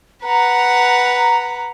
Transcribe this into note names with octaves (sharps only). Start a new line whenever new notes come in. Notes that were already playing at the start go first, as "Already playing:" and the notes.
B4 F#5 A#5